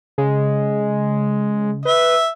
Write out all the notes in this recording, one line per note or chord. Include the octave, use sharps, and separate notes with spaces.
C#3 G#3
B4 E5